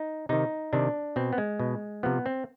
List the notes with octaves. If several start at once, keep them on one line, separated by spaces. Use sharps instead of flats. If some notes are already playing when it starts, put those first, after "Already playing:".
Already playing: D#4
C3 D#3 D#4
C3 D#3 D4
B2 C4
B3
G#3
B2
C3 F3 B3
C4